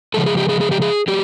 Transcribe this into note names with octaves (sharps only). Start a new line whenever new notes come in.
C#3 F3 G#3 A4
G#4
G4
G#4
G#4
G4
G#4
F#3 G4